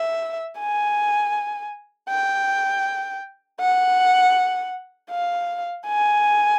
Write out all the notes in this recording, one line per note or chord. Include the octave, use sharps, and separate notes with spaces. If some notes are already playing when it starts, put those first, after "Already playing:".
Already playing: E5
G#5
G5
F#5
F5
G#5